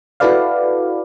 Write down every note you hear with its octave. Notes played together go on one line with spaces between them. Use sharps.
E4 F#4 A4 B4 D5 F5